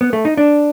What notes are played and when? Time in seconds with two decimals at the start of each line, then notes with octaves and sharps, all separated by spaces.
0.01 B3
0.13 A3
0.25 D#4
0.37 D4